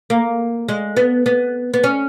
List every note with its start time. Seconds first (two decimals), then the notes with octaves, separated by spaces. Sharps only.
0.10 A#3
0.68 G#3
0.97 B3
1.26 B3
1.74 B3
1.84 C#4